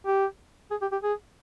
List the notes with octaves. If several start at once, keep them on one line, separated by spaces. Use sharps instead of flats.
G4
G#4
G4
G4
G#4